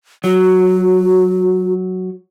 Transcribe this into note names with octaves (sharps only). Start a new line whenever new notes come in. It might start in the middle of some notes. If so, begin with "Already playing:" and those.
F#3 F#4